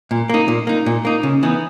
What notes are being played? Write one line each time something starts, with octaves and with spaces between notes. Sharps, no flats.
A#2
A#3 D#4
A#2
A#3 D#4
A#2
A#3 D#4
C#3
E3 B3 D#4